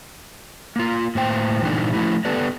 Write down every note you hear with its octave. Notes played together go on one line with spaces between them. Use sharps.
A#3 F4
A2 A#3 C5 G5
A#2 E3 G3 C4 D4 D#4
F3 A3 E4 G4
B3 G4 A4 B4 D5